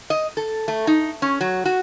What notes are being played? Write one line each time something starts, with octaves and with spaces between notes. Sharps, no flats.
D#5
A4
A3
D#4
C#4
F#3
F#4